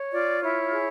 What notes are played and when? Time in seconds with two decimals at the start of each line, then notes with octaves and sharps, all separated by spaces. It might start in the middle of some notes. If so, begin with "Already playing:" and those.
Already playing: C#5
0.13 F4 D5
0.42 E4 C#5
0.71 G#4